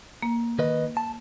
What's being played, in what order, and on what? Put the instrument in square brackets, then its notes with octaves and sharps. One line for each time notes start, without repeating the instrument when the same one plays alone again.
[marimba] A#3
[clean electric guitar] D#3 B4 D#5
A5